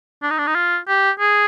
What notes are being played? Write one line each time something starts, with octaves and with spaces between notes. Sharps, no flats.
D4
D#4
D4
D#4
F4
G4
G#4